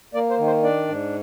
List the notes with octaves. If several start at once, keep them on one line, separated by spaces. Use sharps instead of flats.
A#3 D5
C5
D#3
C5
D4 D5
G#2